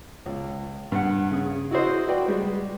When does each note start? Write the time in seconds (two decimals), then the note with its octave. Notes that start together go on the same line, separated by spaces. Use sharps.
0.26 C#2
0.92 G2 F#5
1.31 C#3 G#4
1.71 E4 F#4 G#4 C5 D#5
2.08 F#4 B4 D5 G5
2.28 G3 G#3